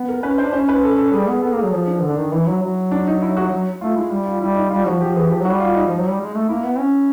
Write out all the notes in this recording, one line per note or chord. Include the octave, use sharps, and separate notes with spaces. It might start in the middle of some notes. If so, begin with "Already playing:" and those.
Already playing: B3
A#4
C#4 B4
C#4 C5
D4
C#4 C5
B4
A4
A4
G3 G#4
B3 G#4
B3 A4
A#3 G#4
F#3
F3 G#4
D4
D3
D4
D#3 D#4
E3 E4
F#3 E4
F#3
D4
D#4
E4
F#4
F#3
A3 F4
G#3 E4
G3
F4
G3 E4
D#4
G3 F4
F3 F#4
F3 G4
E3 G#4
F3 G4
F#3 F#4
G3
F4
D#4
F3
F#3
G3
G#3
A3
A#3 E4
B3
C#4